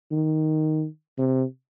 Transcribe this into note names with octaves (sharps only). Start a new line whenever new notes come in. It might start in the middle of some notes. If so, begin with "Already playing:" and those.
D#3
C3